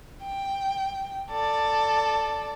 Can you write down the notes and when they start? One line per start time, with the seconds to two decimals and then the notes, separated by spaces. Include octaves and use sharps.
0.23 G5
1.30 A4 D5